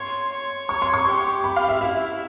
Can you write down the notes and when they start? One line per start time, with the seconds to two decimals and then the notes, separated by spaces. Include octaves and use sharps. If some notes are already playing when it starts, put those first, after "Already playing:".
Already playing: C#5 C6
0.32 C#5
0.69 C#5 C#6
0.82 C6
0.94 C#6
1.07 G4
1.44 B5
1.56 F5
1.69 E5
1.81 E4 E5